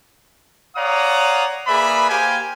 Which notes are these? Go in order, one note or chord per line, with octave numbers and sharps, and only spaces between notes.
C#5 D5 F5 F#5 A#5 D#6
A#3 G#4 B4 D5 E5 B5
A#3 G4 C5 F5 G5 G#5